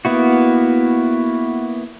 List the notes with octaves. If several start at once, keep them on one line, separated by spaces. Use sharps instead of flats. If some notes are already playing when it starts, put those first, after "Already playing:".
A#3 B3 E4 F#4